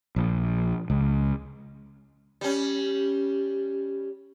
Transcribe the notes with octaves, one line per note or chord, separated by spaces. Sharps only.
A#1
C#2
G3 C#4